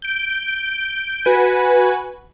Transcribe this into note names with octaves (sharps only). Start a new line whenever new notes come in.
G6 D7
F#4 B4 G#5